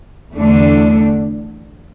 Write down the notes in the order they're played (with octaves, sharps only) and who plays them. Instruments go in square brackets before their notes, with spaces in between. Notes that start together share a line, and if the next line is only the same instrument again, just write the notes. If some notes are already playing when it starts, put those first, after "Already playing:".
[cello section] E2 D3 A3 D4